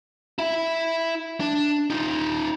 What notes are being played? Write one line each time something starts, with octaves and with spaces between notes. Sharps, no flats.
E4 E5
D4
D#4 F4